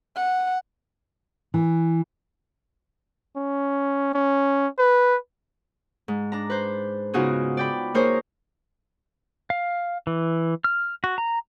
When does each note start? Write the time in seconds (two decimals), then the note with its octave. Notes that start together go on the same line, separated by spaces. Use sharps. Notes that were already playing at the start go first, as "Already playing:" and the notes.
0.16 F#5
1.54 E3
3.37 C#4
4.14 C#4
4.78 B4
6.08 G#2
6.32 D4 A#5
6.50 B4 C5
7.14 C#3 B3 D#4 F4 F#4 G#4
7.57 D5 G5 B5
7.94 A#3 D#4 G#4 A#4 C5 C#5
9.50 F5
10.07 E3
10.64 F6
11.04 F#4
11.18 A#5